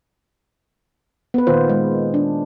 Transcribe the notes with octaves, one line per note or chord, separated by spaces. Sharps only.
B3 B4
A#2 D#3 F4 C5
G#3
D4